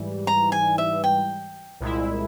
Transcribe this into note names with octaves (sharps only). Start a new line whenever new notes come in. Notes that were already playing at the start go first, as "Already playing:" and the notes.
Already playing: G#2 E3 G3
A#5
G#5
E5
G5
C2 A#2 G#3 E4